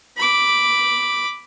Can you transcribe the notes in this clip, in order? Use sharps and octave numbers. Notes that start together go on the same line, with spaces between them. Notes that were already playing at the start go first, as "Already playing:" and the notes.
B5 D6